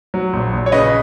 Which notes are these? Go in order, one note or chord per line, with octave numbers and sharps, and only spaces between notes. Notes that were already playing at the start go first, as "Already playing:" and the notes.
F#3
A#1
A#1
C#5
C#3 B4 D#5